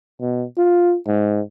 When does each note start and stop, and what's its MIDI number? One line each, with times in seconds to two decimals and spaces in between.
0.21 0.44 47
0.58 0.97 65
1.07 1.41 44